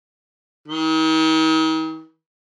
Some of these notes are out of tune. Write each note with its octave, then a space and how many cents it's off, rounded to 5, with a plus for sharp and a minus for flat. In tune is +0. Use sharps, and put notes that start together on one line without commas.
D#3 +40